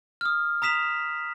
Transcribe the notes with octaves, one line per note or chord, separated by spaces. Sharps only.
D#6 F6
A#5 D#6 B6 E7 F7